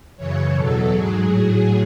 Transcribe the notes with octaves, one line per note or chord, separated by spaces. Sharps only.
F#2 C#3 E3 C#5
E2 B2 F#3 A4
G#2 F#3 G#4
A2 F#3